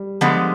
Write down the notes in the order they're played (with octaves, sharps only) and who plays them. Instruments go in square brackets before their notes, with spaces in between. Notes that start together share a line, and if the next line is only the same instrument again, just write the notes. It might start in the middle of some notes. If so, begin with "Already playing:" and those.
Already playing: [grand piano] G3
[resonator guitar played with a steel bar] D3 F3 G#3 B3